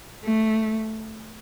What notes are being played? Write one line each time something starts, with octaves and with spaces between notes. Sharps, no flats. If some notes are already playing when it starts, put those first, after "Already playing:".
A3